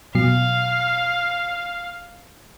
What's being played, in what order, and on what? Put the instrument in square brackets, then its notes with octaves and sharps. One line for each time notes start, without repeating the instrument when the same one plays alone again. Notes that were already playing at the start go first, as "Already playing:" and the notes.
[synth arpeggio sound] B2 F#3 C7 [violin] F5